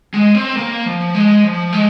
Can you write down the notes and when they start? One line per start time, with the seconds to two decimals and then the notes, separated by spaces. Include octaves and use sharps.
0.14 G#3
0.35 C4
0.57 A#3
0.86 F3
1.15 G#3
1.44 F3
1.73 G#3